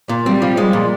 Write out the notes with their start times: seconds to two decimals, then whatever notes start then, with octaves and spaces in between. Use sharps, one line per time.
0.09 A#2
0.26 G3 C4
0.42 F3
0.57 G#3
0.73 A#2